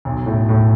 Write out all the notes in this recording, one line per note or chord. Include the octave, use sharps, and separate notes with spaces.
B1
A2
A2